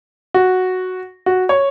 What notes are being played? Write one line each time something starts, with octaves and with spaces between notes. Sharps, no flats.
F#4
F#4
C#5